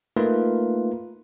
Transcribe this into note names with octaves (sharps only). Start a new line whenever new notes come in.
A3 A#3 D#4 F4 A#4 B4